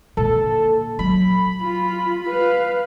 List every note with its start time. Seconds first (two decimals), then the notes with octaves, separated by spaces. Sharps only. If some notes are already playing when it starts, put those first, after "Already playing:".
0.17 A#2 D3 A4
0.99 F#3 B5
1.62 F4
2.28 B4 F5